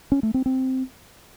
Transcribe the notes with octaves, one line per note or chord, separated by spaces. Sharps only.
C#4
A3
C4
C4